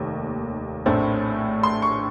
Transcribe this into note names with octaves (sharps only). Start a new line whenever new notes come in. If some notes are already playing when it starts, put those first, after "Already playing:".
Already playing: F1 D#2 A#3
A#1 A2 A3 C4
C6
C#6